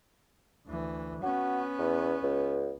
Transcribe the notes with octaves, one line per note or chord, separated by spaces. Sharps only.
D2 E3
B3 C#4 F#4
E2
C#2